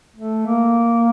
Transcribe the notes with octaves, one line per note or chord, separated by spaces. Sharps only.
A3
A#3